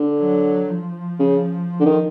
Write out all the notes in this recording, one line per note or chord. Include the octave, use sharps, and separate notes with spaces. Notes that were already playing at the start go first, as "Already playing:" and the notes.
Already playing: D3
F#3
F3
C#3
D3
D#3